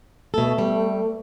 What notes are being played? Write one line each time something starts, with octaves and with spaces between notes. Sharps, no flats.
B2 A3 A4
G3